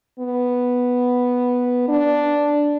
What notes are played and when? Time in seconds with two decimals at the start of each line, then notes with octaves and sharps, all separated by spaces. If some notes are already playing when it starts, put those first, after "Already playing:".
0.19 B3
1.88 D4